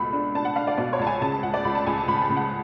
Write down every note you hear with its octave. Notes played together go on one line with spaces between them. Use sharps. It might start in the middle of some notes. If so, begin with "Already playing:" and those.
Already playing: C#2 B2 A3 B5
D4
D4 A5
F#5
D4 F5
D5
B2 D5
C#5
C#2 A5
G#5
C#3 A5
A5
C#2 F#5
D5
C#2 B5
A5
C#2 G#5
A5
C#2 B5
A5
C#3
F#5